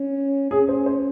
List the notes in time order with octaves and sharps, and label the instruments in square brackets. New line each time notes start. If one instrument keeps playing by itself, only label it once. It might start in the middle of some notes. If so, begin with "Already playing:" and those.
Already playing: [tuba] C#4
[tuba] C#4 [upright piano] G#4
[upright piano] C5
C5